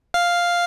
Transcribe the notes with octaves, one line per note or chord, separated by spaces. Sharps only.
F5